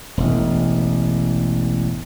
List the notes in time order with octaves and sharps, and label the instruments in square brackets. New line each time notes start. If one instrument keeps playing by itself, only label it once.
[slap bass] E1 A1